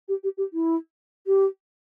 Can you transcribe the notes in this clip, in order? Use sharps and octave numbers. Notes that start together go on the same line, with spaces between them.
G4
G4
G4
E4
G4